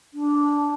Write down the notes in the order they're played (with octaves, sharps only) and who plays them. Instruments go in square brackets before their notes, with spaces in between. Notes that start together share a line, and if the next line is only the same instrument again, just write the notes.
[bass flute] D4